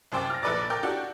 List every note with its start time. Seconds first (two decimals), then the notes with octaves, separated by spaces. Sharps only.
0.12 C2 F#2 C5 G5 D6 A6
0.30 F6 A#6
0.42 A#1 A4 B4 D5 D6 A6
0.70 A#4 G5 D6 G6
0.83 D4 F#4 G4 A4